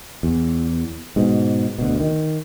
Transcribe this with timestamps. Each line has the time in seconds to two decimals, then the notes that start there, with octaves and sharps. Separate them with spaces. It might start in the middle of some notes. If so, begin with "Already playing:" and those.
0.23 E2
1.16 G#2 B2
1.78 D2 B2
2.00 D#3